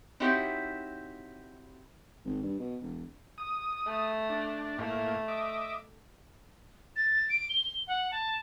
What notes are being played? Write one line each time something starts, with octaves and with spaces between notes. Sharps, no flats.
C4 D#4 E4 F#4 G4 C#5
G#1
G2
B2
E1
D#6
A3
D4
A2 A3 A#3
D#5 E5 D6
A6
D7
G7
F#5
A5